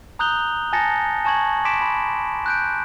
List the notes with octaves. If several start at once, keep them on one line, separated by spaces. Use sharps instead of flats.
A#5 D#6 F#6 G6 F7 G7
G#5 A5 A6 A#6 C#7
G#5 A5 C#6 G#6 F#7
C6 D6 B6 D7 E7
B5
F#6 G6 D7